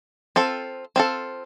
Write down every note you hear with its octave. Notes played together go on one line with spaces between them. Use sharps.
C4 F4 A4
C4 F4 A4